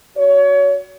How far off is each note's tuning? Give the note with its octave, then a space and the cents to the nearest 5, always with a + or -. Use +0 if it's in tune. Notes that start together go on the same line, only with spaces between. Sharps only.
F#4 +0 C#5 +30